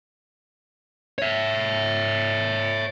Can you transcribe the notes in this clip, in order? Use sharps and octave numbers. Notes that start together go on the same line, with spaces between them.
C#5 E5